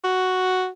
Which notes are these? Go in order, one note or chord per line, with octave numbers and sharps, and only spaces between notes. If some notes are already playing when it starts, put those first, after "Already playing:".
F#4